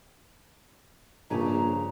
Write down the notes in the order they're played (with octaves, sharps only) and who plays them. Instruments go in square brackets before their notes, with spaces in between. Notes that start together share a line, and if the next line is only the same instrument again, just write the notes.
[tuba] A#1 [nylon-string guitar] G2 C#3 G#5 [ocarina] A#5